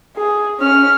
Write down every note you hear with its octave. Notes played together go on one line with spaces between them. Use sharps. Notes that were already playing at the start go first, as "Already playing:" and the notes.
G#4
C#4 F6